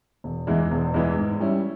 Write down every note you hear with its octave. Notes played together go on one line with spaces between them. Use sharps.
E1
E2 E3 G#3
E1
E2 E3 G#3
G#2
G3 C#4 E4